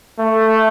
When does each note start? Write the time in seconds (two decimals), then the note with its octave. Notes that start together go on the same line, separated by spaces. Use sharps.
0.20 A3